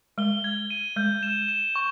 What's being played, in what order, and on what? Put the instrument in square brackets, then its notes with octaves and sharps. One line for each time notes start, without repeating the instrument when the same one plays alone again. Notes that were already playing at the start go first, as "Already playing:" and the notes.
[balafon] G#3 [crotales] G7
[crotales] G#6
D#7
[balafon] G#3 [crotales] G6
[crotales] E7
E7
C#6